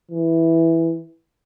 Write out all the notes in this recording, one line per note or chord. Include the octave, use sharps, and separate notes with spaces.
E3